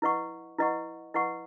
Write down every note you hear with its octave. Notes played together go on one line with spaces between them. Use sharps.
E4 B4 D#5 F#5 C#6
E4 B4 D#5 F#5 C#6
E4 B4 D#5 F#5 C#6